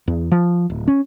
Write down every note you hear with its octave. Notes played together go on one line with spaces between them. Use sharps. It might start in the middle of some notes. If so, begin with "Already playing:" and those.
E2
F3
D1
C#4